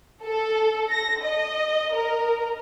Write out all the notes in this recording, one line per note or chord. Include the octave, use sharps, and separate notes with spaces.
A4
A#6
D#5
A#4